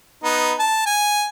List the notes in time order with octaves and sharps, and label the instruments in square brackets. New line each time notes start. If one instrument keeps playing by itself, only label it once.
[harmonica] B3 D#4
A5
G#5